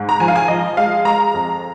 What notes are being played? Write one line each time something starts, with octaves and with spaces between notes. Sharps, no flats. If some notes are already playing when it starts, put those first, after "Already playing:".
Already playing: G#2
A#5
F3 G#5
F5
G#5
F3 D#5
G#3 F5
G#3 A#5
F2